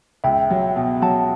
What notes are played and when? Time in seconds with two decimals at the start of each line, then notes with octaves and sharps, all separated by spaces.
0.24 C#2 E5 G5
0.50 F#3
0.76 B2
1.02 F#3 F#5 A5